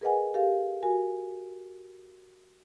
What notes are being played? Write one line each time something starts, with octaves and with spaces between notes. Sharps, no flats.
G#4 A#4 B4 D#5 F#5 G#5
G4 A4 A#4 F5
F#4 A#4 G#5